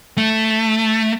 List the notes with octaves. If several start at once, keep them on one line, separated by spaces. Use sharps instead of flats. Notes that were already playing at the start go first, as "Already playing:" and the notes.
A3